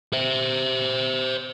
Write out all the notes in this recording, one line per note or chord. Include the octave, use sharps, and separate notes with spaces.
C5 E5